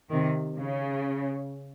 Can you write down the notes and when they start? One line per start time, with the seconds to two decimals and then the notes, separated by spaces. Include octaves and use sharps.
0.10 C3 D#3
0.56 C#3